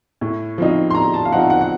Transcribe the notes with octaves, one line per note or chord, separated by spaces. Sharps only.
A2
F3 C4 D#4
C6
A2 A#5
A5
F5
F3 C4 D#4 F#5
F#5
F#5